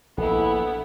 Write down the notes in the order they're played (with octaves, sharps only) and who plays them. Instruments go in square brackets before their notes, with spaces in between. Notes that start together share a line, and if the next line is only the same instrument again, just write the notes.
[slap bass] A#1 G#2 [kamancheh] B3 E4 [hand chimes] A4